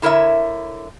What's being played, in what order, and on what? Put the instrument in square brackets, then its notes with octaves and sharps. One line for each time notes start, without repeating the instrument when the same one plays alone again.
[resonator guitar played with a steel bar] D3 E4 A#4 C#5 E5